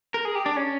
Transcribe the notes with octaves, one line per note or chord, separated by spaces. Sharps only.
A#4
G#4
G4
D4
C#4